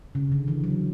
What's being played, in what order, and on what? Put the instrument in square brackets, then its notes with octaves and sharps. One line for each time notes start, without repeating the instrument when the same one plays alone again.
[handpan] C#3
D3
E3
F#3